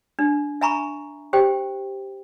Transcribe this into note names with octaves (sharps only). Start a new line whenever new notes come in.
D4
E5 G#5 A#5 B5 C#6
G4 C5 G5